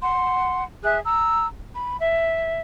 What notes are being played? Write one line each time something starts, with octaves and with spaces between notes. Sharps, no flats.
F#5 C6
G#4 E5 F#6
A#5 E6
B5
E5